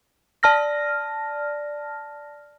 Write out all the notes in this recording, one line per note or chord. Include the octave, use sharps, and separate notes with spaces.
D5 A5 F6 A#6